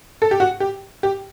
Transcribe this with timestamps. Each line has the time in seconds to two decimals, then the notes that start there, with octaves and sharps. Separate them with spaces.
0.22 A4
0.31 G4
0.40 F#4
0.60 G4
1.03 G4